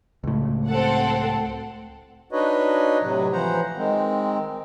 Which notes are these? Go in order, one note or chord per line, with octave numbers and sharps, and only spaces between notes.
C#2 A2
C4 A4 F#5
D4 D#4 F#4 B4 C#5 D#5
A2 C3 F#3
E3 F3 C5 F#5 A#5
D#3 G#3 C4